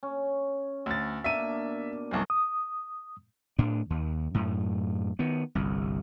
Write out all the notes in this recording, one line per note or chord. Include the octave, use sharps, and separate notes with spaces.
C#4
D2 A6
B2 A#3 D4 E5 D#7
C2 F#2 C3 D#3 A3
D#6
A2 D4
D#2
F#2 A2
D#3 B3
G1 C2